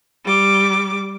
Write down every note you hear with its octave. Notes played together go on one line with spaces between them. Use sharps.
G3 D6